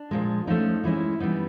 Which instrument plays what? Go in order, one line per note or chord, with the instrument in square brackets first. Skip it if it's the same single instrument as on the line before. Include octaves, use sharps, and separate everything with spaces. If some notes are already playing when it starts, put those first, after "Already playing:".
Already playing: [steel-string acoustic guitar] D4
A#2 F3 G#3
F3 A3 C#4 D#4
E3 G#3 C#4 E4
E3 G3 B3 D#4